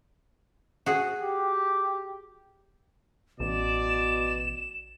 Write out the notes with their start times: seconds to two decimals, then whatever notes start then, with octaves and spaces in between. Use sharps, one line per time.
0.86 F#4 G#4
1.23 G4
3.40 A1 B2 D5 E7